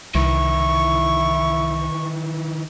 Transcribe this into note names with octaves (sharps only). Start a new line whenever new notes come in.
C2 D#3 E3 E4 C#6